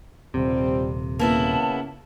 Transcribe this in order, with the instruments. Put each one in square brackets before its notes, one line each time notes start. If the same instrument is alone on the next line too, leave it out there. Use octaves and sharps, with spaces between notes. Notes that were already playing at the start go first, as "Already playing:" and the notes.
[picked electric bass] D#1 C3 [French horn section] F3 G3 C4
[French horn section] C#3 [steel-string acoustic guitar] A#3 B3 E4 [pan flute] A5